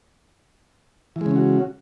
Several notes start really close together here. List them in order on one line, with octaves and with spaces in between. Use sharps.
E3 G#3 C#3 C#4 F#4